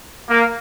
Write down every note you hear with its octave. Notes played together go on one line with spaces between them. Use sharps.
A#3